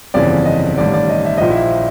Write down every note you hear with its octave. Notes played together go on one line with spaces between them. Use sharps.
G1 F2 C#3 E3 D5
D#5
A1 G2 D#3 D5
D5
D#5
E5
A#1 A#2 F3 D#5
E4 E5